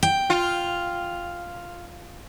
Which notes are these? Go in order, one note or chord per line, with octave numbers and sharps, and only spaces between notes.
G5
F4